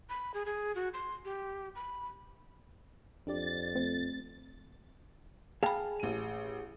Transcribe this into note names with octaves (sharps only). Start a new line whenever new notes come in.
B5
G#4
G#4
F#4
C6
G4
B5
F2 D4 G4 D5 A6
A3 C4
G#4 F5 G5 A5 B5
A1 D#7